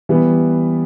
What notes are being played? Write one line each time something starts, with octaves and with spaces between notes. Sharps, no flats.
E3 G3 B3